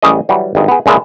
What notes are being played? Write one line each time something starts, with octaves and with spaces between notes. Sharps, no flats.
A1 G3 C#4 G#4 D#5
E3 F#3 G3
G#1 G2 D#5
B3 G#4
C#2 A#2 G#3 E4 A5